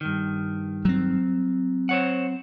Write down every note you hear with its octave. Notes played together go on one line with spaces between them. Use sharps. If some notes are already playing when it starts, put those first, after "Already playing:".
G2 D#3
F#3 C4
C5 C#5 F#5